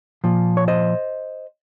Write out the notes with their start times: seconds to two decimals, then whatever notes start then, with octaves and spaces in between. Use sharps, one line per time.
0.24 A#2 F3
0.57 C#5
0.68 C5 D#5